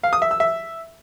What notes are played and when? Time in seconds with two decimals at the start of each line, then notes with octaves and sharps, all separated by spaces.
0.04 F5
0.13 D#6
0.22 E5
0.31 E6
0.40 E5